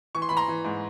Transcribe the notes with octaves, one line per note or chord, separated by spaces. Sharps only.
E3 C#6
C6
E3 B5
A#5 C6
E3
G#2